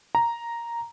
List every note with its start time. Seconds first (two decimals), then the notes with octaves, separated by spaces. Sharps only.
0.15 A#5